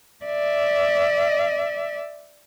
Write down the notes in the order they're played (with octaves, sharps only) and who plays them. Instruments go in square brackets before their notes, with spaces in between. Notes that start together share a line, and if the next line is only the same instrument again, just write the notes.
[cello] D5 E5